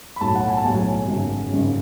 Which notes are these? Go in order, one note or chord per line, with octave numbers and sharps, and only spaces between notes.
B5
B1 A2 F#3 A5
F#5
G#5
A5
B1 A2 F#3 G#5
G#1 F#2 C#3
G#1 F#2 C#3